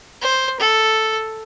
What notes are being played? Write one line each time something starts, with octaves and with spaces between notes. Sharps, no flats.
C5
A4